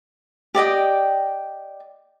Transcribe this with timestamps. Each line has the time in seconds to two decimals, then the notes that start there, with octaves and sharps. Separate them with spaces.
0.55 G4 D5 D#5 G5